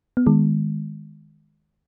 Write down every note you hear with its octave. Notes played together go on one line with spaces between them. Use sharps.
B3
D#3 G#3